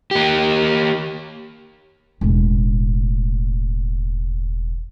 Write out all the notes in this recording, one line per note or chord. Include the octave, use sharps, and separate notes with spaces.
A#3 G4
E1 A2